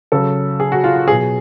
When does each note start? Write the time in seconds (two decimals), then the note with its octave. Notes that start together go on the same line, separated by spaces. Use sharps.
0.12 C#3 F#3 A4
0.60 G#4
0.72 F#4
0.84 F4
0.96 F4
1.08 B2 F#3 G#4